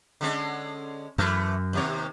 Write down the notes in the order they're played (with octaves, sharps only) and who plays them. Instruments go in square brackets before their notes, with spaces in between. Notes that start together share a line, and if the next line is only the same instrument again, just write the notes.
[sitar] D3 G#3 C#4
[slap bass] F#2 [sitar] E3 A3
[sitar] D#2 C3 C#5